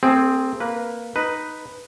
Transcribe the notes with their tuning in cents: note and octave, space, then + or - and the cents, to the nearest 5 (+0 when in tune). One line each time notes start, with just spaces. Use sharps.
A3 +45 C4 +0 G#4 +0
A#3 +0 B4 -15
D#4 +0 B4 +0